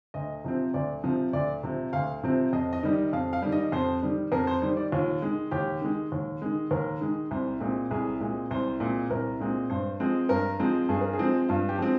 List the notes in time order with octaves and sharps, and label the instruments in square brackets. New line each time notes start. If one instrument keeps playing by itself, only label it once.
[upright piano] D2 D#5
C3 F3 C4
D2 D5
C3 F3 C4
D2 D5
C3 F3 C4
D2 F5
C3 F3 C4
F2 D#5
D#5
D#3 G3
D#5
F2 F5
F5
D#3 G3
D#5
F2 C5
D#3 G3
F2 A#4
C5
D#3 G3 C5
D5
D#2 F4
D#3 G#3
D#2 G4
D#3 G#3
D#2
D#3 G#3
D#2 A#4
D#3 G#3
C2 C5
A#2 G#3 C4
C2 G#4
A#2 G#3 C4
C2 C5
A#2 G#3 C4
C2 A#4
A#2 G#3 C4
G2 C5
F3 G#3 C4
G2 A#4
F3 G#3 C4
G2 G#4
A#4
G#4
F3 G#3 C4
G2 F4
G4
F3 G#3 C4